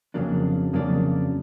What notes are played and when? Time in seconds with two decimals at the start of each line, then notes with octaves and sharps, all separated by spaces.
0.14 F2 C#3 F#3 A#3 D4
0.73 F2 C#3 F#3 A#3 D4